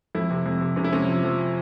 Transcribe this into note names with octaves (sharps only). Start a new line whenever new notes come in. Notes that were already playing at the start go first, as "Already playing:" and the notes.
F2 E4
C3
F2
C3
C3 C#4
E4
C3 C#4
F3
F3